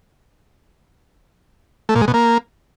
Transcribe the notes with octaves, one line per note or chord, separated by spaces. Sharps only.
A3
A#2
G#3
B2
A#3